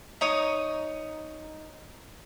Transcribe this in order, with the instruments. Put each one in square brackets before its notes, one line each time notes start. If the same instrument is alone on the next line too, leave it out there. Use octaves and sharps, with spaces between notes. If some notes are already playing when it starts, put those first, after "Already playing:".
[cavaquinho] D#4 C#5 D#6